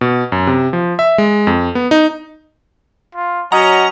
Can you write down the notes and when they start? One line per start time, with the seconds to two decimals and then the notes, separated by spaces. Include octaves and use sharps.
0.01 B2
0.32 F#2
0.47 C3
0.73 F3
0.99 E5
1.18 G#3
1.47 F2
1.75 B3
1.91 D#4
3.15 F4
3.52 F#3 C#4 D#5 F#5 A#5